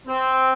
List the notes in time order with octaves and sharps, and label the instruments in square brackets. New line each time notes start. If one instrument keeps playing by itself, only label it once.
[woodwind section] C4